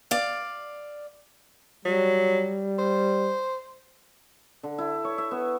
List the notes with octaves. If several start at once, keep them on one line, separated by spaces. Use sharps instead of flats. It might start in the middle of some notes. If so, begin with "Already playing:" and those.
D5 F5
F#3 G3
C5
D3
E4
C#5
E5
B3